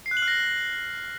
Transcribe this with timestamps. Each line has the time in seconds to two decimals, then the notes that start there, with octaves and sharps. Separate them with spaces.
0.06 C7
0.11 F#6
0.17 F#7
0.22 F6
0.28 A#6